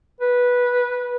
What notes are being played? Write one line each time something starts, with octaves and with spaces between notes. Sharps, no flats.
B4